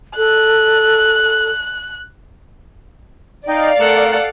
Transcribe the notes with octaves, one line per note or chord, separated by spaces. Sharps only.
A4 F#6
D#4 D5 D#5 F5 G5
A3 A4 A#4 F#5